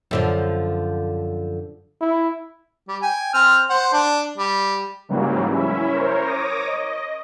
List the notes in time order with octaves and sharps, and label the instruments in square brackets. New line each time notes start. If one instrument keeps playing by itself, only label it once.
[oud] F#2 D3 F3
[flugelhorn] E4
[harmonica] G3
G5 G#5
C4 F6
C5 F#5
D4
G3
[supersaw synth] G#2 C#3 E3 F#3 G3 A#3
C#4 E4 E5
A#4 C5 C#5
C#5 D6 D#6 A#6
D#5